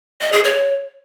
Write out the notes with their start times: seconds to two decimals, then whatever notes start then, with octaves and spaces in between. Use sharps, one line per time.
0.21 D#5
0.33 G#4
0.44 C#5